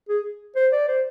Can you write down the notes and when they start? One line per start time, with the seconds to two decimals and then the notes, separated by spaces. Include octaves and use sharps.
0.09 G#4
0.56 C5
0.72 D5
0.88 C5